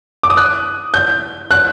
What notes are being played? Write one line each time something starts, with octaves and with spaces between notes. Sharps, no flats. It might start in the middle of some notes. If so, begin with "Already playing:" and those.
D6
D#6
F#6
G6
F#6